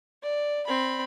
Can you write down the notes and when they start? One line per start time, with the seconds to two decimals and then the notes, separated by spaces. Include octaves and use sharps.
0.23 D5
0.67 C4 B5